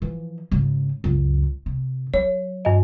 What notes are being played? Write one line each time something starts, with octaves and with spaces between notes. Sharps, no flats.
E3 F3
G#1 C#3
C#2 F#2
C3
F#3 C#5
G2 D#5